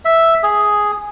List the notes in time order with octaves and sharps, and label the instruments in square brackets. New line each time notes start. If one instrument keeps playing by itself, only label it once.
[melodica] E5
G#4